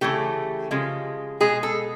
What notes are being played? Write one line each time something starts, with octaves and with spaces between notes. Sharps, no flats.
C#3 E3 A3 G4
C#3 F3 G#3
B2 G#3 G#4
A4